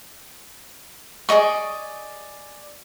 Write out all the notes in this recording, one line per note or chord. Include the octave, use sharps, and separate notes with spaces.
G#4 D5 D#5 C#6